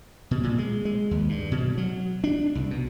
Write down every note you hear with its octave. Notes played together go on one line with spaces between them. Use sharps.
B2
A#2
G#3
G#3
D#2
G2
B2
F#3
D4
C2
B2